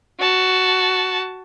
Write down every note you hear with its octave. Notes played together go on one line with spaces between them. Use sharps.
F#4 A5